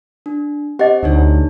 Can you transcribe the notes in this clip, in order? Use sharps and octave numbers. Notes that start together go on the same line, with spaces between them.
D4
C4 G4 C5 D#5 F#5
D2 D4 D#4 C#5